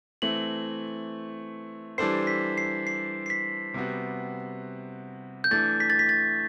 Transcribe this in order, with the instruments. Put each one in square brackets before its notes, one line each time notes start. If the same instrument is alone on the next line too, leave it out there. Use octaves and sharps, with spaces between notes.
[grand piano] E3 A3 C4 [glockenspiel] F#7
[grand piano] E3 G3 D4 A4 C5 [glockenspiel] C7
[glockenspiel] B6
C7
C7
C7
B6
[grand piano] C3 G3 B3 F#4
[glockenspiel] G6
[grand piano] E3 A3 D4 [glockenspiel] A6
[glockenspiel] B6
A6
B6
A6